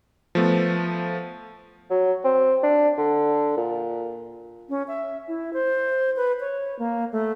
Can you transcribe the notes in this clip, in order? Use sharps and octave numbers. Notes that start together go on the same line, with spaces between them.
F3 A3 B3
F#3
C4
D4
D3
A#2
C#4
E5
E4
C5
B4
C#5
A#3
A3